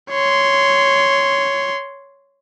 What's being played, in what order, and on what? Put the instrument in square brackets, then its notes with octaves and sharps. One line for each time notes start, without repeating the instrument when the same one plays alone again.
[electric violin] C#5 C6